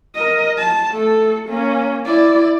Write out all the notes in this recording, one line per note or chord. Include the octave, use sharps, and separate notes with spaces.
A#4 D#5
A5
A3 A4
A#3 C#4
E4 D5